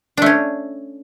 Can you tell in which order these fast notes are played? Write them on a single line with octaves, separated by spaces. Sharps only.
D4 A3 C#4